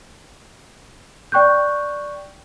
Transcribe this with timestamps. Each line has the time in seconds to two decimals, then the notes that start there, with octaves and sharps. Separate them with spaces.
1.32 D5 G5 C#6 F#6 G6